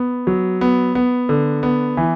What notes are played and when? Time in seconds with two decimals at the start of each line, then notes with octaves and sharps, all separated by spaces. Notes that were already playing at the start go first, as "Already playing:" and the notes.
Already playing: B3
0.27 F#3
0.61 B3
0.95 B3
1.29 D3
1.63 B3
1.97 E3